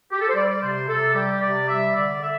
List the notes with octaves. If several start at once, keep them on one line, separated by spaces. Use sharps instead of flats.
G4
A4
C5
G3 D5
D5
C3 C5
C3 A4
G3 G4
C3 D5
G3 E5
D3 D5
D3 E5